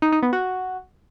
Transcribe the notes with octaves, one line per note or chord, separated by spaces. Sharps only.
D#4
D#4
B3
F#4